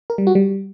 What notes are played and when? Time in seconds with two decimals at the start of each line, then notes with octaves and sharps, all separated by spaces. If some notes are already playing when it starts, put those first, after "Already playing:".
0.10 A#4
0.18 G3
0.27 F#4
0.35 G3